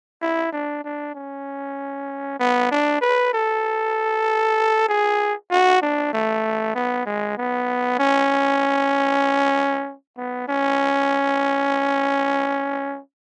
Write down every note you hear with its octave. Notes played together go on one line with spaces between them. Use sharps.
E4
D4
D4
C#4
B3
D4
B4
A4
G#4
F#4
D4
A3
B3
G#3
B3
C#4
B3
C#4